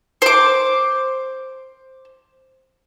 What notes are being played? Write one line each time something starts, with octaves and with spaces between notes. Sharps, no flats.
C5 D6